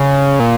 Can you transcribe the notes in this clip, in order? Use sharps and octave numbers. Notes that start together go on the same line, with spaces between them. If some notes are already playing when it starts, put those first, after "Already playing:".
Already playing: C#3
A#2